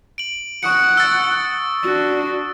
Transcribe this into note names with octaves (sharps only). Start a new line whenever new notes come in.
D7 F#7
F#5 C#6 D#6 C#7
E6 A6
D4 F#4